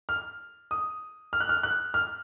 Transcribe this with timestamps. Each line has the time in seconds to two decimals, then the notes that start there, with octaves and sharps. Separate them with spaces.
0.09 F6
0.71 D#6
1.33 F6
1.40 F#6
1.49 F6
1.63 F#6
1.94 F6